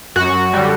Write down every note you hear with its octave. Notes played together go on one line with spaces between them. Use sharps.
F#2 F#4
D3 G3